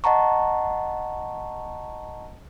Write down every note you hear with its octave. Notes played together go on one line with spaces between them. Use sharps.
D#5 F#5 A5 A#5 C#6